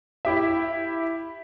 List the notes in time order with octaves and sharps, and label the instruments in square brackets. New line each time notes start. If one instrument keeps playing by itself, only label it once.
[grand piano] E4 G4 E5